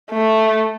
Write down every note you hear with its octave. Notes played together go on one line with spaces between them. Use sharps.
A3